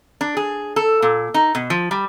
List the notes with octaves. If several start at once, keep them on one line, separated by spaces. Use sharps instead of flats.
D4
G#4
A4
A#2
D#4
B2
F3
G3